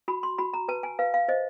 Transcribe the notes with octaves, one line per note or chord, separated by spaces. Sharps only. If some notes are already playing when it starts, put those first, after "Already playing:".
F#4 B5
C6
F#4 B5
A#5
B4 A5
G#5
B4 F5
F5
C5 D#5